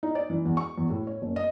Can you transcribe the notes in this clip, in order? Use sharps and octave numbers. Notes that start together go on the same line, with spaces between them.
D#4
D5
E3
E2
C#6
E2
A2
C#5
F#1
D#5